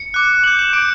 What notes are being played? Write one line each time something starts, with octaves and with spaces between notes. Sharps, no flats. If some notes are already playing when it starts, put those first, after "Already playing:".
Already playing: C#7
D6 F#6
D6 G6 F#7
E7
D6 G6 D7